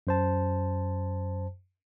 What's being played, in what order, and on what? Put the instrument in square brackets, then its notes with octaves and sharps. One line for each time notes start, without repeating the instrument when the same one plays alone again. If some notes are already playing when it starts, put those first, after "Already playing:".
[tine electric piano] F#2 C5 A5